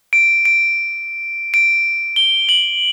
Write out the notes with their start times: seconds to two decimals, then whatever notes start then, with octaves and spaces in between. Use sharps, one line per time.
0.13 D7
0.45 D7
1.54 D7
2.16 G7
2.49 F#7